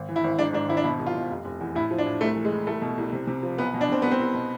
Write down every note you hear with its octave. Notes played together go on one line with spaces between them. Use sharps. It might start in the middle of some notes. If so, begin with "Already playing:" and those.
Already playing: G#1
E3
E4
G#1
G#2 D4
G#2 D4
G#1 E4
D4
B2 E4
C2
F4
B2
F1
F1
E2
A2 E4
F3
D4
A2
C2 A3
E3
G#3
E3
C2 A3
B2
C2
C3
C3
F3
B1 B3
B2
D4
B2 C4
C2 B3
C4
C2
B2